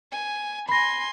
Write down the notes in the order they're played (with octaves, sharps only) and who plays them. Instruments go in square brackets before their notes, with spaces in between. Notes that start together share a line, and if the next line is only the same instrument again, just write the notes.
[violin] G#5
[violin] G#5 C6 [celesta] B5 A#6